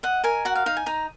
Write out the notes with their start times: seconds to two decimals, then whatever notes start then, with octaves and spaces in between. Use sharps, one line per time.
0.03 D#5 F#5
0.24 A#4 G#5
0.45 F#4 F#5
0.55 F5
0.66 D#4 F5
0.77 G#5
0.86 D#4 A#5